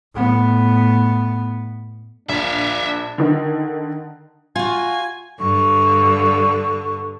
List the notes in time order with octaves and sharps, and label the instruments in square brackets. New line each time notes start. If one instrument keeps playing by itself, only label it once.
[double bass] A2 B3
[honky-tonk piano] A#1 [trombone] D4 [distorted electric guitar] E5 F5
[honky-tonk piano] D3 D#3
[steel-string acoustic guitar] F4 F#4 [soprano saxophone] G#5
[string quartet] G2 D3 [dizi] C#6